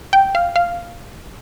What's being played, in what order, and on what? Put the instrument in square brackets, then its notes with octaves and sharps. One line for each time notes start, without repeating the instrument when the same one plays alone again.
[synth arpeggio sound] G5
F5
F5